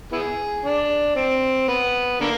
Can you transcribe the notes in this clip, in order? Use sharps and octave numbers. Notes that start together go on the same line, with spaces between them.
B3 E4 G#4
D4
C4
B3
D3 A#3